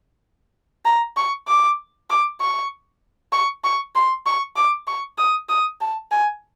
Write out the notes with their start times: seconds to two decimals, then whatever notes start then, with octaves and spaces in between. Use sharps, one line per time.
0.85 A#5
1.17 C#6
1.48 D6
2.10 D6
2.41 C#6
3.32 C#6
3.64 C#6
3.95 C6
4.26 C#6
4.56 D6
4.87 C#6
5.18 D#6
5.49 D#6
5.81 A5
6.11 G#5